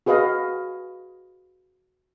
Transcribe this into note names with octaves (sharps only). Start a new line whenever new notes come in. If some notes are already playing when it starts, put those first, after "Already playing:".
F#4 G#4 B4 D#5 F5